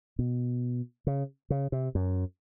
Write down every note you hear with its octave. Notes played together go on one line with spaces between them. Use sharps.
B2
C#3
C#3
C3
F#2